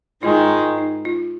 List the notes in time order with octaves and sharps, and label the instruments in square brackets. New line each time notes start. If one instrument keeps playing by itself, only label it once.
[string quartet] G#2 D#3 G#3 [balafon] F4
[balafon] F4
D#4
F4